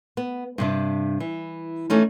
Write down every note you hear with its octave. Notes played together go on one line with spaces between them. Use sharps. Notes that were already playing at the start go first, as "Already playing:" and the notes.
B3
G2 C3 D4
E3
E3 A3 C#4 D#4